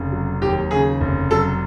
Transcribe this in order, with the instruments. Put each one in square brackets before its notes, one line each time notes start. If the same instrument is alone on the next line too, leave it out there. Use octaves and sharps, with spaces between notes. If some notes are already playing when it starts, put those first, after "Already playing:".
Already playing: [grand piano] F1 C#3
F#3
D#2 G4
C#3 G#4
F1
F#3 A4